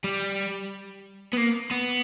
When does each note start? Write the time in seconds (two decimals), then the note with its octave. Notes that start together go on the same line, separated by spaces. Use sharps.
0.04 G3
1.33 B3
1.37 A#3
1.71 B3